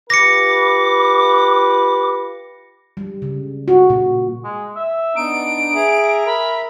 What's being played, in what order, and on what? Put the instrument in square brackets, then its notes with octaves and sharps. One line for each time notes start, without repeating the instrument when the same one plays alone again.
[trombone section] F4 G4 B4 [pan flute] D6 [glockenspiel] A#6 C#7
[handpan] G3
C#3
F#4
A#2
[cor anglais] G#3
E5
[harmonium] B3 D4 [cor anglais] D#4 [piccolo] D7
[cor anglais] G#4 [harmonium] E5 A#5
[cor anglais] A#4 [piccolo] B5